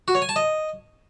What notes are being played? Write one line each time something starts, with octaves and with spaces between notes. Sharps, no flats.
F#4
C#5
G#5
A5
D#5